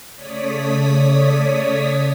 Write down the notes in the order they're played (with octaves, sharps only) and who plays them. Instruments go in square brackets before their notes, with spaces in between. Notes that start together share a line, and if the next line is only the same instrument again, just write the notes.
[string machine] C#3 A3 C#5 D5 D#6 B6